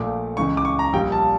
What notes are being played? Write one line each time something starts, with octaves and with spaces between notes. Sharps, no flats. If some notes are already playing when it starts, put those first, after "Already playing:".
Already playing: A#1 A#2 A3 D6
C#2 C#3 E3 C#6
D6
C#6
A#5
A#1 A#2 G3 G5
A5